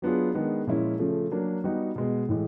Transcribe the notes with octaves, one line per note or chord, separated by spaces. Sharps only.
F#3 B3 D4 F4 G#4
D#3 G#3 B3 D4
A#2 F3 G#3 C#4 E4
C#3 F3 A3
F#3 A#3 D4
G3 B3 D#4 F#4
B2 G#3 B3
A2 E3 G#3